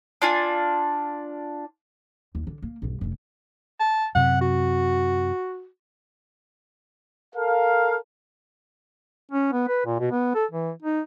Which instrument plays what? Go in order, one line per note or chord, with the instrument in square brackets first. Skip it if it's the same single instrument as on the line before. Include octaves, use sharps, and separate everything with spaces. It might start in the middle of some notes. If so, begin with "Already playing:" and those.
[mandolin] D4 F4 G#5
[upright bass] D#2
D3
A#3
B1 G2
F1 D3
[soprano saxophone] A5
[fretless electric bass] F#2 C3 [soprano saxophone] F#5
[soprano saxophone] F#4
[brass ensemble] A4 A#4 F5
[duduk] C#4
B3
B4
A#2
B2
B3
A4
E3
D#4